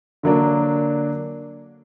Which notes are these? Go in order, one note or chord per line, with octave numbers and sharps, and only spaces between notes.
D3 F#3 A#3 D4